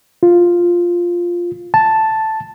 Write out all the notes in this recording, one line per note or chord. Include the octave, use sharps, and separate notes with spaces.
F4
A5